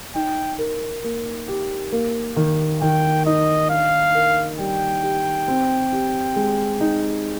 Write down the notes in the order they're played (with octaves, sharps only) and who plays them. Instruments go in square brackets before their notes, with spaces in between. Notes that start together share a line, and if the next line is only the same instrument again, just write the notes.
[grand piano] D#4 [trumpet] G5
[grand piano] A#4
A#3
G4
A#3
D#3
[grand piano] D#3 [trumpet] G5
[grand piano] D#4 [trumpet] D#5
[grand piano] D4 [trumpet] F5
[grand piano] A#4
[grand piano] G3 [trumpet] G5
[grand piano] G4
C4
G4
G#3
D#4